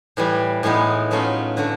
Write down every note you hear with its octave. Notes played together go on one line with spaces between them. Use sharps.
A2 E3 G3
A2 E3 G#3 B3 D#4
F#3 A3 C#4 F4
D3 F#3 A3